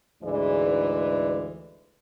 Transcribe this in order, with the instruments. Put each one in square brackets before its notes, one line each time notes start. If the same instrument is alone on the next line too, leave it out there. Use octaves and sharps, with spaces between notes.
[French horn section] D2 G#2 E3 G#3 D5